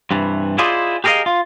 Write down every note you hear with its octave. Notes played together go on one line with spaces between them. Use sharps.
G2 C3 E3
E4 F4 G#4 C5 D5 D#5
G4 G#4 A#4 C5 D#5 F5
F4